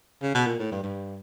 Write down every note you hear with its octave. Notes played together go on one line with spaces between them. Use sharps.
C#3
B2
A#2
A2
G2
G2